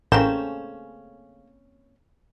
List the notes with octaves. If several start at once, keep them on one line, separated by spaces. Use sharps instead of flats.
A1 C#3 A3 A#3 C4 C#4 G6 E7